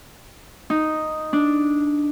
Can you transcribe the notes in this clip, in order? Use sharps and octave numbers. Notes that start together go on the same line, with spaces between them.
D#4
D4